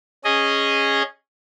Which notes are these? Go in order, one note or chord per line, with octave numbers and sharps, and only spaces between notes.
C#4 G#4 D#5